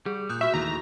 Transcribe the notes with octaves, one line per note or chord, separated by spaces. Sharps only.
G3 G#4
A#2 D#6 F#6 G6
F#4 E5 C#6
D#2 E3 A3 A#5